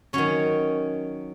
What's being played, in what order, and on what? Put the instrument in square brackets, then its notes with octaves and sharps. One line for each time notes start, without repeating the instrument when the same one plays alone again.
[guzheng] D#3 F#3 C#4 C#5